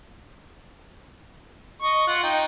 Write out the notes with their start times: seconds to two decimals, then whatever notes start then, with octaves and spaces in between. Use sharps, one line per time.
1.82 D#5 C#6
2.07 F4 F#5
2.23 D#4 G5